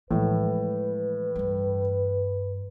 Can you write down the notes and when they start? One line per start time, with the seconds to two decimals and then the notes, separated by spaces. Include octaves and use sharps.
0.11 A2 E3 F3 G#3 B4
1.36 G2 G3